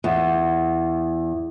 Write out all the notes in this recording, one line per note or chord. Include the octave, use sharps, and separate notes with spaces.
E2